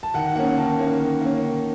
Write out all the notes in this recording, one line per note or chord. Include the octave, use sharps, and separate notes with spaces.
A5
D#3 F#5
A#3 C#4 F#5
D#3 A5
A#3 C#4
D#3
A#3 C#4
D#3